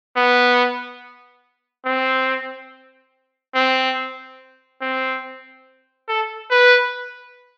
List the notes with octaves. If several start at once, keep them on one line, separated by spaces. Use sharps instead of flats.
B3
C4
C4
C4
A4
B4